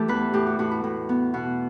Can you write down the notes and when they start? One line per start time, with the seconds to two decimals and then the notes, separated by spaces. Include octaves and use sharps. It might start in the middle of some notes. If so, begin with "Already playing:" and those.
Already playing: E3 A3 G4 A4
0.08 E2 B4
0.33 A2 G4
0.47 F#4
0.59 A2 F#4
0.71 E4
0.84 A2
1.09 B3
1.34 B2 F#4